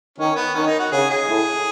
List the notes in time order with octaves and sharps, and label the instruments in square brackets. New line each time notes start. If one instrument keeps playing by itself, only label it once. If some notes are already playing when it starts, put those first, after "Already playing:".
[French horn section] D#3 [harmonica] C#4
[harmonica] B3
[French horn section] D#3 [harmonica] C#4
[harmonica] D#4
F#4
[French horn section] C#3 [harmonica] G#4
[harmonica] G#4
[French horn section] A2